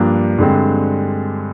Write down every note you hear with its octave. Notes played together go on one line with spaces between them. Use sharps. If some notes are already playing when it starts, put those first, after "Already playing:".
Already playing: G2 F3 A#3 D4
G2 D3 G#3 C4